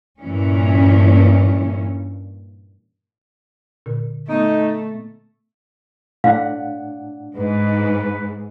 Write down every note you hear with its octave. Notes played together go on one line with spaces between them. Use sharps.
G2 A#2 E3 C#4
A#2 D3
A3 B3 D#4
A2 D4 F5 F#5
G#2 B4